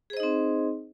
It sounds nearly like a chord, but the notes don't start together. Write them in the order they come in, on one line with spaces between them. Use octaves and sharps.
G#4 C5 D#5 D#4 C4